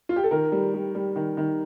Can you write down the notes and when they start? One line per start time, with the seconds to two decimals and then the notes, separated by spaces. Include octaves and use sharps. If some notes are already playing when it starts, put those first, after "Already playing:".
0.09 F4
0.16 G4
0.24 A4
0.31 D#3 A#4
0.52 G3
0.74 G3
0.95 G3
1.16 D#3
1.37 D#3